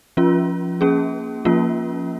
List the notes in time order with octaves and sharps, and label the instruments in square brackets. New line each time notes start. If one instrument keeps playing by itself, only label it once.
[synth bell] F3 C#4 F4
A#3 C#4 G#4
F3 A#3 C#4 F4